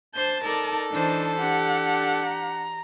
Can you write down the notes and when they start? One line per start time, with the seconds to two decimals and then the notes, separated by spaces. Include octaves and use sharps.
0.15 D4 C5 A5 G6
0.44 D#4 A4 A#4 D5
0.91 E3 D4 D#4 C5 A5
1.39 D4 G4 F#5
2.25 A#5